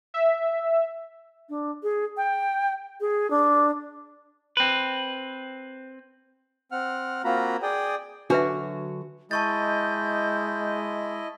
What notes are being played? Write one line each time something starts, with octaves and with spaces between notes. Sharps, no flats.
E5
D4
G#4
G5
G#4
D4
C4 B4
C4 F#5 F6
A#3 C4 F4 F#4 A#5 B5
G#4 D5 G5 D#6
D3 F#3 D4 F#4 B4 E5
G#3 E4 D#5 A5 C#6 G6 A6